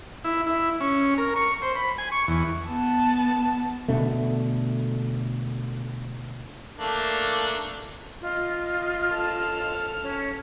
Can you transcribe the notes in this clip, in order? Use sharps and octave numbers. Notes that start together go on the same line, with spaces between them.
E4
E4
C#4
A#4
C#6
C5
B5
G#5
C#6
E2
B3 A5
B2 D3 A3
A3 A#3 D4
F4 D#5
A4 F6
C#4 C#5